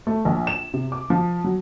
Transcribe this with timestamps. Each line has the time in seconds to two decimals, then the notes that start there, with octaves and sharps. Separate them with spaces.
0.07 A3
0.25 A#1
0.47 E7
0.74 C3
0.92 D6
1.10 F3
1.44 F#3